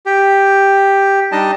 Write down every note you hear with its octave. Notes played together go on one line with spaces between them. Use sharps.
G4
G3 D4 D#4 D#5 A5